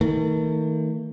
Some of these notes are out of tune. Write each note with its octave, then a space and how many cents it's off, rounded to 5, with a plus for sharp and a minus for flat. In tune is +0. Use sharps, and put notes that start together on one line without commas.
D#3 +35 A3 +45